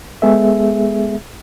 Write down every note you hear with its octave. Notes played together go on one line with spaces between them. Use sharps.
G#3 B3 G#4 A4 E5